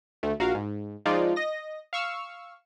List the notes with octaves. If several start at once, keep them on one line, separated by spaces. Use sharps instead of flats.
D2 A3
A#1 F#4 A#4 F5
G#2
F3 G#3 D#4 F4 D5
D#5 A#6
F5 C#6 E6 F6